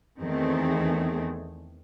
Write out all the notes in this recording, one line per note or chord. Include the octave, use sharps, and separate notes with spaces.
E2 D#3 A3 C4 G#4